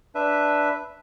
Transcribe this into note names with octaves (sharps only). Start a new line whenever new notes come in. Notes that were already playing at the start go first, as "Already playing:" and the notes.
D4 B4 E5